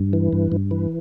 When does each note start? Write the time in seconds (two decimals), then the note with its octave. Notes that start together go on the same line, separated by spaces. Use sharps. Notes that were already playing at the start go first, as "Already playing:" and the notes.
Already playing: G2
0.13 E3
0.33 G2
0.52 G2
0.71 E3